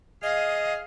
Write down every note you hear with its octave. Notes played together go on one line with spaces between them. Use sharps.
G#4 D#5 F5